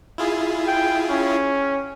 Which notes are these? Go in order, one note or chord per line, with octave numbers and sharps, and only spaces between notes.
E4 F4 G#4
G5
C#4